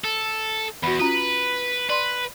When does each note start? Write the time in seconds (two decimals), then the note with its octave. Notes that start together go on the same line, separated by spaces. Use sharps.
0.05 A4
0.83 E2 F#4 B5
0.99 C#4 F4 B4
1.90 B4 D5 C6